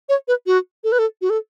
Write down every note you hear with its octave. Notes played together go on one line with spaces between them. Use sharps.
C#5
B4
F#4
A4
B4
A4
F#4
A4